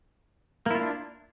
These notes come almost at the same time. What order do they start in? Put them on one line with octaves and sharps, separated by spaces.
A#3 E4 F4 D4